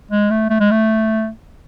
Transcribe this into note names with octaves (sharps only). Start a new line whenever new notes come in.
G#3
A3
A3
G#3
A3